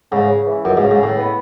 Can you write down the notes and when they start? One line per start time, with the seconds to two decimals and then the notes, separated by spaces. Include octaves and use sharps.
0.12 G#2 C#3
0.29 C#3
0.47 E3
0.65 C#2 F#2
0.77 G#2
0.82 C#3
0.91 G#2
1.00 A2 C#3
1.17 B3